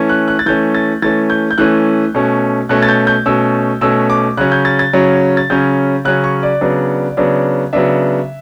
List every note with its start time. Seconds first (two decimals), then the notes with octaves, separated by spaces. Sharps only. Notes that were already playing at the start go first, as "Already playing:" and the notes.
Already playing: E3 A3 C#4
0.09 F#6
0.28 F#6
0.39 A6
0.46 E3 A3 C#4 G6
0.74 A6
1.02 E3 A3 C#4 A6
1.30 G6
1.51 G6
1.58 E3 A3 C#4 F#6
2.14 B2 A3 C#4
2.69 B2 A3 C#4 F#6
2.82 A6
2.88 G6
3.07 G6
3.26 B2 A3 C#4 E6
3.81 B2 A3 C#4 E6
4.10 D6
4.37 C#3 F#3 C#4 F#6
4.52 G6
4.65 A6
4.79 A6
4.93 C#3 F#3 C#4
5.37 A6
5.50 C#3 F#3 C#4 G6
6.05 C#3 F#3 C#4 F#6
6.24 C#6
6.43 D5
6.61 C#3 F#3 B3 D4
7.17 C#3 F#3 B3 D4
7.73 C#3 F#3 B3 D4 E5